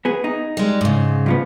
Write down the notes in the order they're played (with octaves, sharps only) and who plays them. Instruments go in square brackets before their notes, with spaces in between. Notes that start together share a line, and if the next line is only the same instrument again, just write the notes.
[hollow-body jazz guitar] B3 G#4
D#4
[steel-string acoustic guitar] G3 G#3
G#2 C#3
[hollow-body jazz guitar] G2 F3 B3